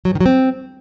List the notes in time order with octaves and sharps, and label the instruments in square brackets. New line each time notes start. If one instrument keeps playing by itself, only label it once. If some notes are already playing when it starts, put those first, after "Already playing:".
[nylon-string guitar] F#3
G#2
D#3
F#3
C4